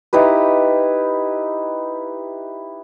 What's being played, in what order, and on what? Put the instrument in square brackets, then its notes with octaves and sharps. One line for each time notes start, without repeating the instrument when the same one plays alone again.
[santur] D#4 E4 G4 B4